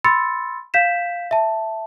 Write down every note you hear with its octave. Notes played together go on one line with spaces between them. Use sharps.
B5 C6 E6 A6 C#7
F5 G6 B6 E7
E5 A5